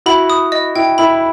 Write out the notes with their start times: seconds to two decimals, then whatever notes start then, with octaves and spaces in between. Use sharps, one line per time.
0.06 E4 F#4 B5
0.30 D#6
0.52 D#5
0.76 E4 G5
0.98 E4 B5